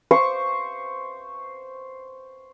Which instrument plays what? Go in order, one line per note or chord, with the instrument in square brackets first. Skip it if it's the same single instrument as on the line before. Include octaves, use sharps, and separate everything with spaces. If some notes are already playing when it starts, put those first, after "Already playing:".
[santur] C5 C#6 D6